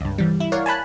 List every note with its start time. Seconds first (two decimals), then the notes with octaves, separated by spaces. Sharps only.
0.01 C#2 G2
0.18 E3 G3
0.40 E4
0.52 A#4 C#5 D5 F5 F#5
0.66 G#5 A5 B5 F#6